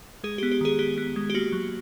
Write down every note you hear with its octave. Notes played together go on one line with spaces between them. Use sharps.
G#3 G#4
G4
B3
G4
D#3 G#4
B3 G4
B3
G#3
G4
A#3 F#4
F#3